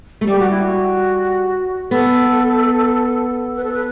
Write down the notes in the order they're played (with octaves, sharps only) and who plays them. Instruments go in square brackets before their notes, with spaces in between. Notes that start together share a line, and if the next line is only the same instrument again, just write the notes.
[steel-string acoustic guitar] A3
[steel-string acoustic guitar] G3 [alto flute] G4
[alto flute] F#4
E4
F#4
[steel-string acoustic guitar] B3 [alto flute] A4
[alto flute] B4
A4
B4